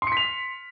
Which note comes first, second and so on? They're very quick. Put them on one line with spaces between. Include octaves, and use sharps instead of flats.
C6 C#7 B6 F7